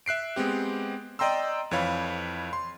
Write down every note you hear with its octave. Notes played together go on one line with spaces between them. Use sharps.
E5 F#6 C7 D7
G#3 B3 C4 G4
D5 D#5 G5 A#5 C6 E6
F2 E3 C#5 F5 B5
C6